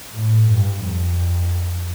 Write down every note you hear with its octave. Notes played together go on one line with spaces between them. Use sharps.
A2
G2
F2